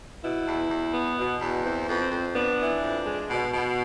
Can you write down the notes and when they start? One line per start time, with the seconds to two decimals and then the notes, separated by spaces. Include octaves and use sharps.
0.23 B2 E4
0.47 E2
0.70 E2
0.94 B3
1.17 B2
1.40 E2
1.64 E3 C4
1.88 F2 B3
2.00 C4
2.11 F2
2.35 B3 D4
2.59 E3
2.82 F2
3.06 G#3
3.30 B2
3.53 B2